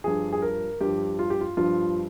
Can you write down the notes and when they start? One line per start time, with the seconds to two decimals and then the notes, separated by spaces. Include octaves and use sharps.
0.04 G2 F3 G#4
0.33 G#4
0.42 A#4
0.81 G2 F3 G4
1.19 F4
1.30 G4
1.41 F4
1.57 G2 F3 F4